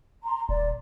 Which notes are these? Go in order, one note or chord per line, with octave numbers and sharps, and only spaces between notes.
A#5 C6
D#1 D5